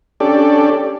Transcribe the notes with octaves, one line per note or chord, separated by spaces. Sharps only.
C#4 D4 G4 A4 D5